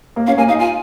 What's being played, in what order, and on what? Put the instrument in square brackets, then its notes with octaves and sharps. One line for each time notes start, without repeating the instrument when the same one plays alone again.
[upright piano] A#3
[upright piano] C#4 [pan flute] F5
[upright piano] A#3 [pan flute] G#5
[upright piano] D#4 [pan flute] F5
[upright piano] F4 [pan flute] G#5